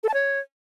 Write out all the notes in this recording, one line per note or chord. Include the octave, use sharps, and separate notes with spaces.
A4
A5
C#5